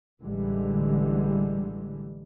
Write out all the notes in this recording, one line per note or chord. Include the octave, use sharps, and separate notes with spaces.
A1 D3 E3 G3 G#3